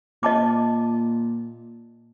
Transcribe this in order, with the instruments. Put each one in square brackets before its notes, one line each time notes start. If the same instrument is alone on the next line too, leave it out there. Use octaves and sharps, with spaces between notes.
[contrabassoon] A#2 [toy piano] D#5 A5 D6